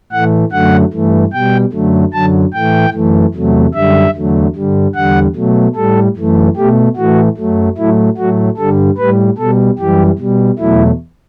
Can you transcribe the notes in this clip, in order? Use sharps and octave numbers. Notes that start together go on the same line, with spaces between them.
A2 E3 A3 F#5
F#2 D3 F#3 A3 F#5
G2 E3 A3
B2 G3 G5
F#2 D3 F#3 A3
F#2 D3 F#3 A5
A2 E3 A3 G5
F#2 E3 A3
E2 C3 F#3 A3
F#2 D3 G3 E5
E2 D3 F#3 A3
G2 D3 G3
E2 D3 G3 F#5
B2 F#3 A3
A2 G3 A4
F#2 E3 A3
B2 A3 G4
A2 E3 A3 F#4
F#2 F#3 A3
A2 F#3 A3 E4
A2 F#3 A3 F#4
G2 D3 G3 A4
A2 G3 B4
B2 G3 A4
F#2 E3 G3 G4
B2 G3
E2 B2 F#3 A3 E4